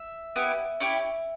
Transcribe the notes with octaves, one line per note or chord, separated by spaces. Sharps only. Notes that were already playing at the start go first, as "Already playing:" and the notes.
Already playing: E5
B3 E4 G4
C#4 E4 G4